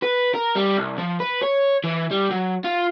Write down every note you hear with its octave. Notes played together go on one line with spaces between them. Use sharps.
B4
A#4
G3
C2
F3
B4
C#5
E3
G3
F#3
F4